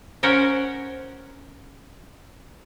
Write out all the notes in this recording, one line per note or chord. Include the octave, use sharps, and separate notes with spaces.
C#4 A#4 C5 C#5 F#5